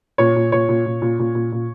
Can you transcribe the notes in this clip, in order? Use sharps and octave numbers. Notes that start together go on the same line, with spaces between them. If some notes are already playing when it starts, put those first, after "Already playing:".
A#2 C#5
A#2
A#2 C#5
A#2
A#2
A#2
A#2
A#2
A#2